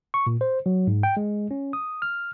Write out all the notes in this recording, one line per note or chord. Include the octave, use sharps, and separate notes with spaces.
C#6
A#2
C5
F#3
G#2
G5
G#3
C#4
D#6
F6